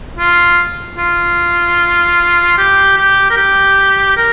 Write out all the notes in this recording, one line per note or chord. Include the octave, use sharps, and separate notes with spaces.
F4
F4
G4
G4
A#4
G4
A#4